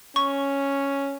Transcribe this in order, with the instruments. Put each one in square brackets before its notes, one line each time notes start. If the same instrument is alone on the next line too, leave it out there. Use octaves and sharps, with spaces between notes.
[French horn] C#4 [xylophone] C#6